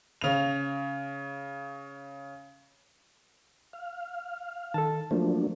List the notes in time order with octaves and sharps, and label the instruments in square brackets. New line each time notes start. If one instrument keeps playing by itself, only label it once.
[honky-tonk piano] C#3 F7
[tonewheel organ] F5
[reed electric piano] D#3 A4 [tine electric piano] A5
[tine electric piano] F3 [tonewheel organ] F#3 A#3 D4 [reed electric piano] A3